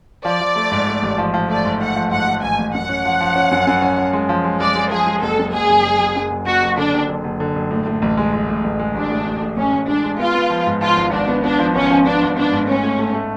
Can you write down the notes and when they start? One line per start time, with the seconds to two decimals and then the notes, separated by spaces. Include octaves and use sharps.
0.25 F3 D5
0.41 F3
0.56 A3
0.72 G#2
0.87 A3
1.02 A1
1.18 F3
1.34 F3
1.49 A3 D5
1.65 G#2
1.80 A3 F#5
1.96 F3
2.11 G#2 F#5
2.27 A3
2.42 A1 G#5
2.59 A1
2.74 F#2 F#5
2.89 C#4
3.05 F3
3.20 F3
3.36 C#4
3.51 F#2
3.67 F#2
3.82 C#4
3.98 C#4
4.13 G#3
4.29 F3
4.45 G#3
4.60 G#3 D5
4.76 G#3
4.91 F3 G#4
5.07 G#3
5.22 F#1 A4
5.38 F#2
5.53 F#1 G#4
5.69 F#1
5.84 F#1
6.00 F#1
6.15 F#2
6.31 F#1
6.47 F#1 F#4
6.62 F#1
6.77 D3 D4
6.93 F#1
7.08 F#1
7.24 F#1
7.40 D3
7.55 F#1
7.71 A2
7.86 A2
8.02 A1
8.17 G#3
8.33 G#3
8.48 A2
8.64 A1
8.79 G#3
8.95 A1 D4
9.11 A2
9.26 A1
9.42 A2
9.57 A1 C#4
9.73 A1
9.88 G#3 D4
10.04 G#3
10.19 B3 F4
10.34 B3
10.50 F3
10.66 G#2
10.81 F3 F4
10.97 G#1
11.12 G#1 D4
11.27 B3
11.44 B3 D4
11.59 F3
11.75 G#1 C#4
11.91 F3
12.06 B3 D4
12.22 G#1
12.37 B3 D4
12.52 G#2
12.67 A2 C#4
12.83 A2
12.99 A3
13.14 A3